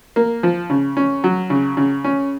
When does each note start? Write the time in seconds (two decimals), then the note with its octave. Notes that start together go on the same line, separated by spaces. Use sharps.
0.16 A#3
0.43 F3
0.70 C#3
0.97 C#4
1.24 F#3
1.50 C#3
1.77 C#3
2.04 C#4